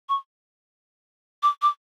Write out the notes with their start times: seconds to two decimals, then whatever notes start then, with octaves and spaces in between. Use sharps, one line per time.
0.09 C#6
1.43 D6
1.62 D6